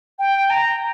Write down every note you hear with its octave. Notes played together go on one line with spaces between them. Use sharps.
G5
A#5